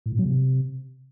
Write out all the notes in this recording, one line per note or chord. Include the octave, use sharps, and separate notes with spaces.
A2
A#2
F#3
C3